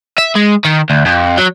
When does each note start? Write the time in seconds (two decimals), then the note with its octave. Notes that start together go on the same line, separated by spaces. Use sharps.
0.18 E5
0.36 G#3
0.65 D#3
0.90 D2
1.06 F2
1.38 F#3